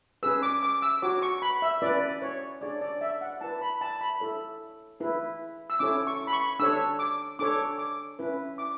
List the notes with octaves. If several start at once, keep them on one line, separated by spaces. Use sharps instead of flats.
C#4 G#4 B4 E6
D6
D6
E6
F#4 C#5 D6
C#6
B5
E5
C#4 E4 B4 D5
C#5
D4 G#4 C#5 D5
D5
E5
F#5
E4 B4 A5
B5
A5
B5
E4 A4 C#5
E4 G#4 B4
E6
C#4 E4 A4 C#5 D6
C#6
B5
C#6
D4 A4 C#5 E6
D6
D4 A4 C#5 D6
D6
C#4 E4 B4
D6